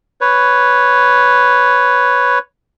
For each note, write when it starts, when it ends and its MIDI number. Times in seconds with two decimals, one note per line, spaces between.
0.21 2.39 71
0.21 2.39 73